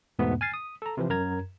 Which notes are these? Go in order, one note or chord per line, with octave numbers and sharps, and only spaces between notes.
E2 G#2 B2 A3 B3
G#5 F6 A6 C7
D#6
A4 A#5
C3 E3 F3
F#2 A#4 A#5 G#6